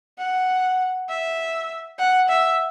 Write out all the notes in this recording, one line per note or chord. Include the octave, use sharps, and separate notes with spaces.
F#5
E5
F#5
E5